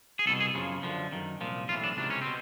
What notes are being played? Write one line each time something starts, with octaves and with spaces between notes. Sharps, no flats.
G#4
C2 B2 A4
G#4
F#2 C#3 F3
F#2 D3 F3
F#2 D#3
C2 A#2 F3
B1 A2 E3 F4
D4
C#2 C3 D#3 D4
C#4
B2 C4